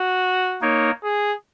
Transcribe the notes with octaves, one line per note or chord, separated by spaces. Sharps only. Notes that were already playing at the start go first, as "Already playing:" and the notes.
Already playing: F#4
A#3 D#4 A#4 C#5
G#4